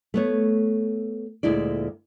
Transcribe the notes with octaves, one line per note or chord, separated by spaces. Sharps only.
A3 B3 C#5
D2 A#2 G#3 E4 D5